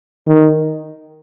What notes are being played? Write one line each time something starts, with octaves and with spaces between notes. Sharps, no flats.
D#3